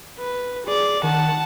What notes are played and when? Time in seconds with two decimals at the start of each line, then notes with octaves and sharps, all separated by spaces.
0.19 B4
0.66 G#4 D5
1.03 D#3 F#5 A5